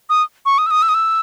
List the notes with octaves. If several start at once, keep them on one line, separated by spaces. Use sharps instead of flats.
D#6
C#6
D#6
E6
D#6
E6
D#6
E6